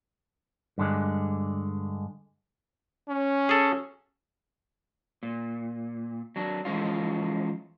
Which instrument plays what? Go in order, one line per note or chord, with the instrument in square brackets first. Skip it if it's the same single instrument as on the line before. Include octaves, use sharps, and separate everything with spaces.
[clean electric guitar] G2 D3 G#3
[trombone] C#4
[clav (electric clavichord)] G#4 A4
[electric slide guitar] A#2
F#3 D4
E3 F3 G#3 C#4 F4